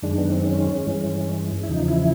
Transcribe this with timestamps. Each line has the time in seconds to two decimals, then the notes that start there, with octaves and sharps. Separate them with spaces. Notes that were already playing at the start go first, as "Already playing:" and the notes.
0.02 F#2 D#3 G#3 D4
0.18 B3
0.31 C4
0.45 C#4
0.86 G2 E3 G#3
1.63 E4
1.68 E2 C#3 F3 D#4
1.88 E4